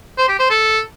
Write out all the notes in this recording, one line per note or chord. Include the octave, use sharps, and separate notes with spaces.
C5
G4
C5
A4